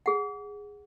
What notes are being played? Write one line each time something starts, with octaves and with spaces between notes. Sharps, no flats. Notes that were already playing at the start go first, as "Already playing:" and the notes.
G#4 F#5